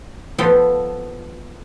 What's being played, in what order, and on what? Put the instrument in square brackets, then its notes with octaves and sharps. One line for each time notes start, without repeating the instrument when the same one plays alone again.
[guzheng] F3 B3 A4 F#5 G5